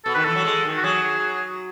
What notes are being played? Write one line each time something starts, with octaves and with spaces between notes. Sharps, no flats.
B2 A4
D#3 B4
E3 A4
F#3
G#3
D#3
F#4
F#3 G#4